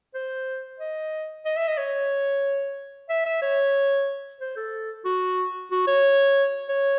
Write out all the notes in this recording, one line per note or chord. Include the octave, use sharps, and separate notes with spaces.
C5
D#5
D#5
E5
D#5
C#5
E5
E5
C#5
C5
A4
F#4
F#4
C#5
C#5